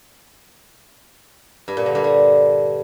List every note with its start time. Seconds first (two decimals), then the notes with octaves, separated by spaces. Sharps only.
1.68 G2
1.77 A#2
1.86 D3
1.95 G2
2.04 G3